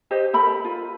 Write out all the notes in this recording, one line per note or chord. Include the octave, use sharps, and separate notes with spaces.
G4 C5 D#5
A4 A#4 B5
F4